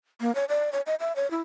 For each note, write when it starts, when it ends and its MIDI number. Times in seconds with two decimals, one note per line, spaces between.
0.21 0.34 58
0.35 0.45 73
0.49 0.70 74
0.73 0.81 73
0.86 0.95 75
1.00 1.15 76
1.16 1.29 73
1.31 1.41 64